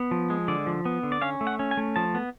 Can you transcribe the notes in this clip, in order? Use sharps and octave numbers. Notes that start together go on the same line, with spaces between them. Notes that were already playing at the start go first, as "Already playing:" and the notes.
Already playing: B3
F3
G#3
D3 D5
F3
B3
D3
D5
C#4 F5
A3
F#5
C#4
G#5
A3
F3 A5
B3